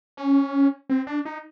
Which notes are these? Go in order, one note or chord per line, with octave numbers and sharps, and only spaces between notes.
C#4
C4
D4
D#4